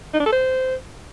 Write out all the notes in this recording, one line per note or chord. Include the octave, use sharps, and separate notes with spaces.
D#4
D4
A4
C5